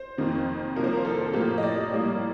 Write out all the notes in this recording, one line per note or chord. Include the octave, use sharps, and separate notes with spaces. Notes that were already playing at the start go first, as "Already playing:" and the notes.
Already playing: C5
F2 C3 D#3 A#3
C2 C3 F3 A#3 A#4
C5
A#4
A4
A2 F3 A#3 G4
D#5
D5
A2 G3 A#3